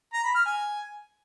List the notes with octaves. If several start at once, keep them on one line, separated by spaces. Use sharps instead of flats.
A#5
B5
F6
G#5